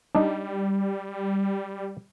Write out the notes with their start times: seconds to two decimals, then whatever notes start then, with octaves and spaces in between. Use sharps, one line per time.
0.15 G3 D4 D#4